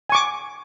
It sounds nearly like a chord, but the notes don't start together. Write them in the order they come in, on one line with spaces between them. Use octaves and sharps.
G#5 C#6 D6